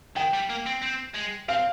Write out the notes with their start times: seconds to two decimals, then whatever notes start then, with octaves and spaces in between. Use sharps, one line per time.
0.16 D#3 G5
0.33 G3
0.50 A#3
0.66 C4
0.82 C4
1.15 G#3
1.48 C4 F5